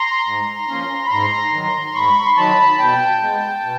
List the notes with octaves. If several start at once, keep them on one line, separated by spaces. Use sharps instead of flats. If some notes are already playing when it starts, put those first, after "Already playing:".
Already playing: A#5 C6
G#2
F3 A#3 C#4
B5
G#2 A#5 C6
D#3 F#3
G#2 B5 C#6
C6
D#3 F#3 A5 B5
B2 G5 A5
G#3 B3
B2